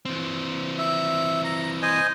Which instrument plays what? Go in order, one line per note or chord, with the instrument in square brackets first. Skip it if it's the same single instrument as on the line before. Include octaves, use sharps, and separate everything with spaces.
[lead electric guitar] E3 C4
[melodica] E5
A#5
C5 D#5 G#5